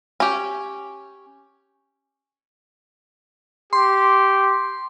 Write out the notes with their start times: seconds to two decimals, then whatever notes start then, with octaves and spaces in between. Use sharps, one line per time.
0.20 C#4 G4
3.73 G4 C6